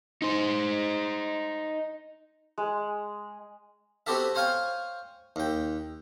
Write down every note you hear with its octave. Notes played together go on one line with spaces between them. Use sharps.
D#4 C5
G#3
B3 C4 F#4 G4 A4 E5
C5 C#5 F5 G5 G#5
D#2 G5